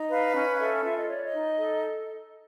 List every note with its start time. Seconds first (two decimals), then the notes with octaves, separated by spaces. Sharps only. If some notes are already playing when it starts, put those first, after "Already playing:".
Already playing: D#4
0.09 B4 F5
0.35 C#4
0.54 F5
0.59 A4 E5
0.83 F4 E5
0.97 D#5
1.08 C#5 D5
1.25 D#5
1.33 D#4
1.58 A4